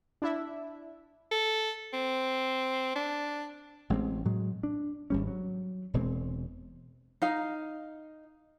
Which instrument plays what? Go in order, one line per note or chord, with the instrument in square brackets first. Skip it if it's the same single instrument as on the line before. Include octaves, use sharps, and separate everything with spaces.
[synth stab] D4 E4 E5
[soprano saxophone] A4
C4
D4
[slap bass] A1 G#3 A#3 C4
A2 F#3 G#3
D4
G#1 G3 C#4
F#3
E1 B2 G#3 C4
[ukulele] D#4 F5